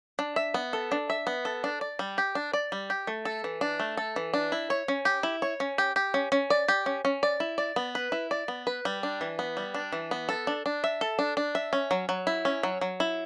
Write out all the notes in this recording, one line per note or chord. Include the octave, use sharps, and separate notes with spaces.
D4
E5
B3
A4
D4
E5
B3
A4
D4
D5
G3
G4
D4
D5
G3
G4
A3
A4
E3
D4
A3
A4
E3
D4
E4
C#5
C#4
G4
E4
C#5
C#4
G4
G4
C#4
C#4
D5
G4
C#4
C#4
D5
E4
D5
B3
B4
E4
D5
B3
B4
G3
D4
E3
B3
G3
D4
E3
B3
A4
D4
D4
E5
A4
D4
D4
E5
C#4
F#3
F#3
E4
C#4
F#3
F#3
E4